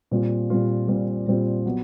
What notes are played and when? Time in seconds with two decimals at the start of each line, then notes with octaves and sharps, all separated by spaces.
0.11 A#2 G3 C4 F4
0.50 A#2 G3 C4 F4
0.88 A#2 G3 C4 F4
1.27 A#2 G3 C4 F4
1.66 F#3 B3